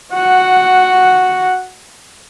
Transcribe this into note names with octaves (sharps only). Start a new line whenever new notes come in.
F#4 F#5